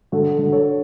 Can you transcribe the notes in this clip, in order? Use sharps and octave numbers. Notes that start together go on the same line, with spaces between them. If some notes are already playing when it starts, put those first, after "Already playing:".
D3 F#4 A4
D3
A4 C#5